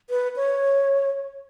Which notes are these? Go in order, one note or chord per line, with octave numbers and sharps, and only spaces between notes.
B4
C#5